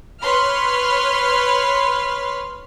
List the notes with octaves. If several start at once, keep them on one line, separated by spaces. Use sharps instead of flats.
B4 C#5 C6 F6